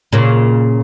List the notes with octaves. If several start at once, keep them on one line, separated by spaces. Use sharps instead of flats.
A#2 C#3